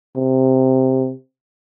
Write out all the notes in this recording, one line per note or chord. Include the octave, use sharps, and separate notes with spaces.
C3